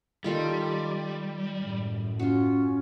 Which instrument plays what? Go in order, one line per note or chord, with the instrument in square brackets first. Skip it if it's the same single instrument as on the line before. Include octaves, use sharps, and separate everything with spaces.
[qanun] D#3 F4 A4 [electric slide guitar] G3
[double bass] F#2 A2
[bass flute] C#4 [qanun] F4 F#4